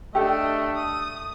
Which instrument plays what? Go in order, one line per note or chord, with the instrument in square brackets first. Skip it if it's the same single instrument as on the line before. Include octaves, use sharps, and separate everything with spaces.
[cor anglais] A3 [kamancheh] D4 D#5 [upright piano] G4 A4
[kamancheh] D#6